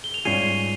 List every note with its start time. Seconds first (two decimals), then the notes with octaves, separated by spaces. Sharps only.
0.04 G7
0.14 F7
0.25 G#2 G3 C#4 F4 G#4 C7 D#7